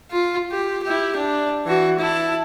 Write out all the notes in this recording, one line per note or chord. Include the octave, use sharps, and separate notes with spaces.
F4
G4
E4 G4
D4
E3 F#4
E4 A5